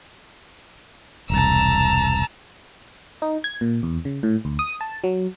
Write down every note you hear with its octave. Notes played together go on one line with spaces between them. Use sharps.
E1 C2 A5 A#5 E6
D#4
G#6
A#2
E2
C#3
A2
D2
D#6
A5
F#3